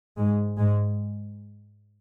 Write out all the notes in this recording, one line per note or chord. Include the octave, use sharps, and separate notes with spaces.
G#2 G#3
G#2 G#3